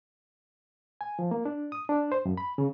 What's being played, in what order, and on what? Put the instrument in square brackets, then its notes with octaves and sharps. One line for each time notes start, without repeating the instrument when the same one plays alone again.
[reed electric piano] G#5
F3
A#3
D4
D#6
D4
C5
F#2
B5
C#3